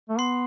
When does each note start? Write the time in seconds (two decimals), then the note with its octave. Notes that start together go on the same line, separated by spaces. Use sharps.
0.09 A3
0.18 B3 C6 C7